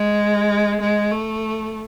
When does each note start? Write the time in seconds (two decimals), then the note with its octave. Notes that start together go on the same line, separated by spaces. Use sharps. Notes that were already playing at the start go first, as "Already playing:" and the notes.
Already playing: G#3
0.80 G#3
1.11 A3